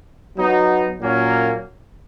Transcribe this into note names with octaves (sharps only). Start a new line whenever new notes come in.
F#3 B3 D#4
A#2 F#3 A#3 C#4